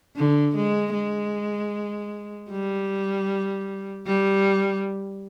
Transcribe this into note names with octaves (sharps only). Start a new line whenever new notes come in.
D3
G#3
G#3
G3
G3